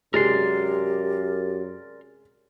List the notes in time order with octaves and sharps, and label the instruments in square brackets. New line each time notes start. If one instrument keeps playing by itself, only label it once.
[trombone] F#2 [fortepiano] C3 G#3 [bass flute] G4 [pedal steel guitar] A#4 D5 C6